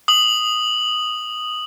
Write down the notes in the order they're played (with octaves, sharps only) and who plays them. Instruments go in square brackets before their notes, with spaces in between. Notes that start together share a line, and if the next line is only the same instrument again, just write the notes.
[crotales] D#6 F#7